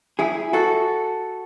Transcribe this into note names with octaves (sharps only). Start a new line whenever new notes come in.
E4 G#4
F#4 A4